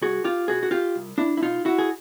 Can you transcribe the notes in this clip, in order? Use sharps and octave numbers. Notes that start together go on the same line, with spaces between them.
C2 F#4 G#4
F4 G4
B2 F#4 G#4
F#4
F4 G4
C2
D4 E4
E4
B2 D#4 F4
E4 F#4
G#4